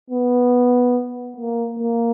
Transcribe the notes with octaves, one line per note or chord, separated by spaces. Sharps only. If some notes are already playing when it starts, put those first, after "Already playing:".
B3
A#3
A#3